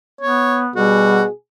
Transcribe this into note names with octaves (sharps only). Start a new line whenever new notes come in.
B3 C#5
B2 G3 F#4 G#4